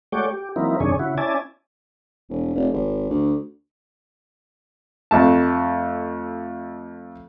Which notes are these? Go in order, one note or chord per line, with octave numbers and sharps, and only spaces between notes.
G#3 A3 F#4 C#5 D5 G5
G4
E3 F#3 A#3 C4 D#4 E4
F#2 C3 D#3 D4 G#4 C#5
C#3 E4 F#4
C#4 E4 D5 G#5 A5
E1
F1
G#1
D2
F2 A3 A5